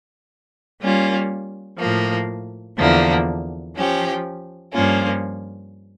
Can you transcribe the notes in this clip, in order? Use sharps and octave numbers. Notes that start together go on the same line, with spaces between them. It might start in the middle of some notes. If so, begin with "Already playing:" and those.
G3 A#3 C#4 F4
A2 F3 A#3
E2 D3 F3 A#3 E4
F3 C#4 G4
G2 F3 A#3 C#4 F4